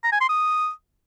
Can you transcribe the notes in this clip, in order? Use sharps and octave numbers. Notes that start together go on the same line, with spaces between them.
A#5
G#5
C6
D#6